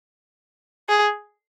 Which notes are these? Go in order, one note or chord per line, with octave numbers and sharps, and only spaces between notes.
G#4